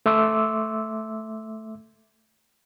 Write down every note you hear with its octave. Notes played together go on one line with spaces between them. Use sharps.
A3 E5 C6 D6 E6